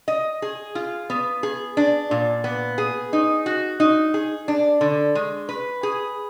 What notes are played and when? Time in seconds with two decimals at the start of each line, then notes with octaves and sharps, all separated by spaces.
0.08 D#5
0.42 G#4
0.75 F4
1.10 B3
1.43 G#4
1.77 D4
2.11 A#2
2.44 B3
2.78 G#4
3.13 D#4
3.46 F#4
3.80 D#4
4.14 G#4
4.48 D4
4.81 D3
5.15 G#3
5.49 B4
5.83 G#4